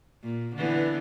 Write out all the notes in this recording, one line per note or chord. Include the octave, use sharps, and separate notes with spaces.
A#2
D3 E3 B3